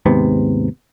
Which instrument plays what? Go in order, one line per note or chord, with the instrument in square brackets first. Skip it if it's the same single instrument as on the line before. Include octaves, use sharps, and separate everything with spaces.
[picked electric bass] D#2 G#2 C3 B3